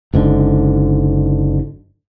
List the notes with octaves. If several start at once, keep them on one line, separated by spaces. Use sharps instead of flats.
F#1 G#2 D3